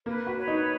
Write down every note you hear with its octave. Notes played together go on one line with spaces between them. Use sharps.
A#3 B4
F#4
B4 C#5
D#4